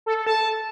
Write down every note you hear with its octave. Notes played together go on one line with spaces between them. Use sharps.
A4
A4
A5